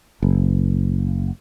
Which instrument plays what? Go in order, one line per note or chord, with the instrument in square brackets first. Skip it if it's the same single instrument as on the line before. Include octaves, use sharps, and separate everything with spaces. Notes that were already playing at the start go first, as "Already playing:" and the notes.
[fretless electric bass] F#1